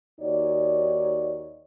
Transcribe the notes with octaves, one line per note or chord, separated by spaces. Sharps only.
D#2 D#4 F#4 C#5 D5